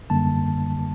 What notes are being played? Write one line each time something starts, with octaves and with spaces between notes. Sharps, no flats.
F#2 D3 G3 A#3 A5